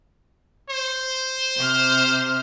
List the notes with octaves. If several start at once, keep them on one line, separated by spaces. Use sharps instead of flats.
C5
C3 F6